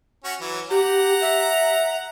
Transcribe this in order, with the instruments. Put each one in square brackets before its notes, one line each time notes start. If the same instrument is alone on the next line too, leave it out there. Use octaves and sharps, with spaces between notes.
[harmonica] C#4 F#4
E3 F#3
[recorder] G4 [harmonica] F#5 A#5
[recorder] E5